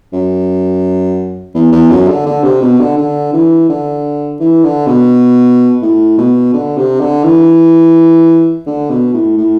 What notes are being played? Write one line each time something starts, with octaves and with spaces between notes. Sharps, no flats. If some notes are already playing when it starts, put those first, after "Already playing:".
F#2
E2
E2
F#2
D3
D3
C3
B2
D3
D3
E3
D3
E3
D3
B2
A2
B2
D3
C3
D3
E3
D3
B2
A2
A2